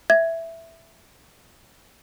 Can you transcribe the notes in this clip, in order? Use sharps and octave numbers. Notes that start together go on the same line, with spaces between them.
E5 G#6